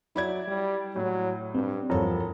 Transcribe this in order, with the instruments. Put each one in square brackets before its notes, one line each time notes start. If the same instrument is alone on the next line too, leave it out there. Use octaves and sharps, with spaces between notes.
[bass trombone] F#3 [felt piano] E4 D5 G#6
[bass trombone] G3
[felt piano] A2 [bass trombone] F#3
[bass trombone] G2 [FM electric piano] C4
[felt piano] E1 A4 [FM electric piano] G2 C#5 A#5 [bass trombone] F3